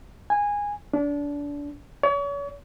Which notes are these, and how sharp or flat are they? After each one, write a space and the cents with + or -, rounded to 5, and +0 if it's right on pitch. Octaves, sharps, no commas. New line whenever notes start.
G#5 -15
D4 -25
C#5 +40